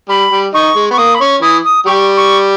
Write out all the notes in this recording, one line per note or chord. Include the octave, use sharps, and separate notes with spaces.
G3 B5
G3
D#3 D#4 C#6
G#3
B3 C#6
A#3 D#6
B5
C#4 C#6
E3 E4 D#6
D#6
G3 G4 C#6
C#6